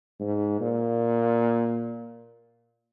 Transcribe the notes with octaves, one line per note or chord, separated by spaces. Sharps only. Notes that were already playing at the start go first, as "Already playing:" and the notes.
G#2
A#2